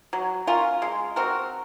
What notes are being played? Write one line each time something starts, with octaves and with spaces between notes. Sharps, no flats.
F#3
C#4 F4 A#4
G#3
C4 F#4 A#4